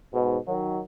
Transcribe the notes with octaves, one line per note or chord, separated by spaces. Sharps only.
G#2 B2
D#3 F#3